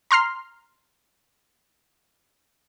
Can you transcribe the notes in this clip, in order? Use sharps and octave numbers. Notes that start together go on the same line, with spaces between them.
A#5 C6 F6 C7